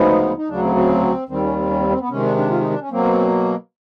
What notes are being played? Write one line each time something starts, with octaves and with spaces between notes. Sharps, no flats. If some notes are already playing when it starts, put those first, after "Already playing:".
Already playing: D2 C#3 F3 G#3 B3 D#4
D#4
D2 C#3 F#3 D4
C4
C4
D#2 D#3 G3 C4
C#4
C4
C#4
C4
C4
B3
C3 D#3 G#3 C#4
D4
D4
F4
D#4
D4
C#4
B2 F#3 A#3 C4